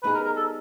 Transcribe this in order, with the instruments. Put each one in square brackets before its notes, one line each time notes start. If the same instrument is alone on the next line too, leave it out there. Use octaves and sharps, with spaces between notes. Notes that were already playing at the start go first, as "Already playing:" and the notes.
[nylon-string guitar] G3 B3 D#4 G#4 [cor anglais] B4
[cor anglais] A#4
A#4
A4